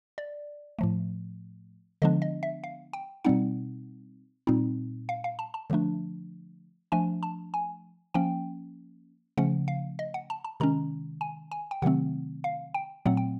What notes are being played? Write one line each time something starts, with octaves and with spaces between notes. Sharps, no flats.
D5
A2 F3 A3
D3 F3 G#3 B3 D4 D#5
D#5
E5
F5
G5
B2 G3 C4 D#4 F#5
A#2 G3 C4 D#4
F5
F5
A5
A5
D3 F3 A3 D4
F3 A3 D4 G#5
A5
G#5
F3 A#3 C#4 G5
C#3 F3 A3 C#4 F#5
F5
D#5
F#5
A5
A5
C3 D#3 G#3 C#4 A#5
G#5
G#5
G5
C3 D#3 F#3 A3 C4 F#5
F5
G5
A#2 F#3 A3 C4 F#5
G5